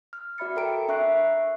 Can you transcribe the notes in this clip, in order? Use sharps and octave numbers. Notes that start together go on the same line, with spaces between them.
F6
F#4 D5 E5 B5 A6 C#7
A4 A#4 G5 A#5 D7
D4 E5 C#6 F#6 C7